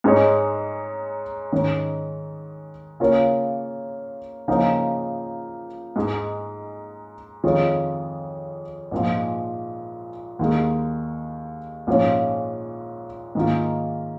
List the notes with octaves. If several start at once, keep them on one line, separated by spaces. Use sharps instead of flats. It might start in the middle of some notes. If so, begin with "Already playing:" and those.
G#2 G#3 D#4 G#4 C#5
G#2 D#3 C#4
C#3 A#3 F4 A#4 C#5
C#3 F3 A#3 D#4
G#2 G#3 D#4 G#4
F2 D#3 G#3 F4 C#5
A#1 G#2 F3
D#2 D#3 G#3
A#1 G#2 F3 C#4 F4
G#2 D#3 A#3 F4